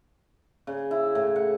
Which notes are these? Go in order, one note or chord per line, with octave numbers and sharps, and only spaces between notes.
C#3
E4
A2
F#5